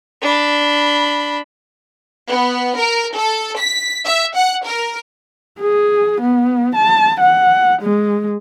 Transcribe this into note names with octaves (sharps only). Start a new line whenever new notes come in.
D4 B5
B3
A#4
A4
B6
E5
F#5
A#4
G#4
B3
A5
F#5
G#3